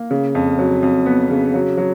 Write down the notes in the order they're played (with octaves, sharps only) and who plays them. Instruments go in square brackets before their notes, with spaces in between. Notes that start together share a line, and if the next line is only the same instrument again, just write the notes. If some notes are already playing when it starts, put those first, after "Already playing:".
Already playing: [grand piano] A#3
C#3
F2
F#3
F2
B3
C#3
F#3
F#3